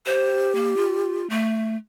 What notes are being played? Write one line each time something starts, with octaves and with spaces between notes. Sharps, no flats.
G4 C5
A#3
F4
A3